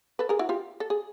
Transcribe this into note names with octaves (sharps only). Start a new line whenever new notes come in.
A4 B4
G#4 A#4
E4 F#4
F4 G4
A4
G#4